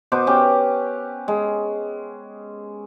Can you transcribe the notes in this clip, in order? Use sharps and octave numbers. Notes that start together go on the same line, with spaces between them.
B2 B4 C5 D6
C#4 G4
G#3